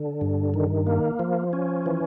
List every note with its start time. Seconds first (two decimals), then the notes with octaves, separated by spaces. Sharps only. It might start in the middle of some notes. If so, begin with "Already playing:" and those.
Already playing: D3
0.21 G2
0.54 D#3
0.87 A#3
1.19 F3
1.53 C#4
1.86 E3